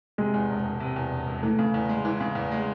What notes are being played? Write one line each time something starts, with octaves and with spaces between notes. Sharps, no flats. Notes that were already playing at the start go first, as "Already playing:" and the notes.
C3 G#3
E2
E1
E1
C3
E2
E1
E1
E3 A3
C#3
E2
G#3
E3
C#3
E2
G#3